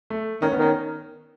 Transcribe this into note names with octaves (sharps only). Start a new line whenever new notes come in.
A3
D#3 C#4
B3
D#3
C#4